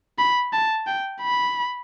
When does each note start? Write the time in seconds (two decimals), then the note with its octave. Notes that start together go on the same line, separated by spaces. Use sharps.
0.19 B5
0.53 A5
0.87 G5
1.22 B5